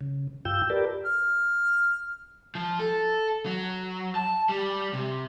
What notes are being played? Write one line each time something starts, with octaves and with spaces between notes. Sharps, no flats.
C#3
G2 F4 G5 E6 G6
G4 A#4 B4 D5 A5
F6
F3
A4
F#3
A5
G3
C3